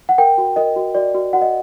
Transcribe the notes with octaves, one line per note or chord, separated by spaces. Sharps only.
F#5
A#4 G5
F#4
A#4 D#5
F#4
F#4 D5
F#4
F#4 F#5
D#5